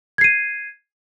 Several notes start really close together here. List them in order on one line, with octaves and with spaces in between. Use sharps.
G#6 C7 D#7